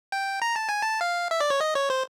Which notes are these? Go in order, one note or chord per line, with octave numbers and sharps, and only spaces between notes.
G5
A#5
A5
G#5
A5
F5
E5
D5
C#5
D#5
C#5
C5